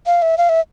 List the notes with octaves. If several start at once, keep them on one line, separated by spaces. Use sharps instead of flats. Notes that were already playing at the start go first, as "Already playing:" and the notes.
F5
E5
F5
E5